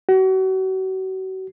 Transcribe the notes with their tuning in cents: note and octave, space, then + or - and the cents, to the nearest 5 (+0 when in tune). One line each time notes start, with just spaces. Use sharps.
F#4 +35